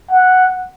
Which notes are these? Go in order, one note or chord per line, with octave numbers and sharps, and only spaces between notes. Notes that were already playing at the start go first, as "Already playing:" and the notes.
F#5